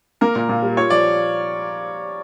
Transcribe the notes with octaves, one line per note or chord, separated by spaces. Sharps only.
A#3 A#4
A#2
A#2
G3
F4 C#5
F3 D5